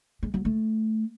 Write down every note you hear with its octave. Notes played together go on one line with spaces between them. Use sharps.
G#3
F#3
A3